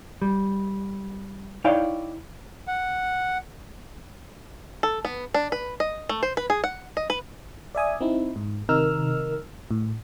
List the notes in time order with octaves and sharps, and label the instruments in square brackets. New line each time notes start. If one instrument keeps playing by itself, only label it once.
[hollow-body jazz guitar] G3
D#4 E4 C#5 D5 F5 G5
[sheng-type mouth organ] F#5
[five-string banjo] A4
B3
D4
B4
D#5
A3
C5
B4
G#4
F#5
D#5
B4
[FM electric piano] D5 E5 G#5 D#6
C4 D#4 E4
G#2
C3 D#3 D#4 A#4 E6 F6
A2